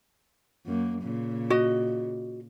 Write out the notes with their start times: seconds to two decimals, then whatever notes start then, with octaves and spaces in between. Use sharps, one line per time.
0.66 F#2 A#3
1.02 A#2 C#3
1.50 F#4 D#5